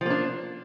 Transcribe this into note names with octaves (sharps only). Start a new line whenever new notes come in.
F3 A#3 D4